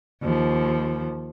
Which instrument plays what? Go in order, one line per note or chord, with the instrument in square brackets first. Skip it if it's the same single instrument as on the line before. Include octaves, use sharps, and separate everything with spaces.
[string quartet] D#2 F3